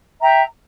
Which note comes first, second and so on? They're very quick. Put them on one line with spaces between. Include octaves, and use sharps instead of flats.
E5 A#5 G5